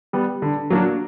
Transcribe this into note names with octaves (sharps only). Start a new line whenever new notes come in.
G3 B3
D3
F#3 A#3 D4 F#4